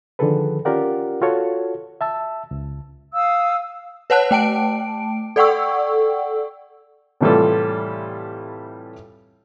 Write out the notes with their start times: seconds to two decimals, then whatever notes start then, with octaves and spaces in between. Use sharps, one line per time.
0.19 D3 D#3 F3 G#4 A4 B4
0.65 C#4 F4 G4 A#4 D5 F#5
1.22 F4 F#4 A4 C#5
2.01 E5 A5 E6
2.51 C#2
3.14 F5 D#6 E6
4.10 B4 C#5 F#5 A5 F#6
4.31 A3 G5 A5 D7
5.36 A4 D5 F#5 G5 C#6 E6
7.21 A2 C3 E3 G3 F4 A4